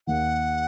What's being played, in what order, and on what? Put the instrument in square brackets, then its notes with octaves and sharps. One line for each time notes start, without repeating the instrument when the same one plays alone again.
[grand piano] D#2 D#3 A#3 [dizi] F#5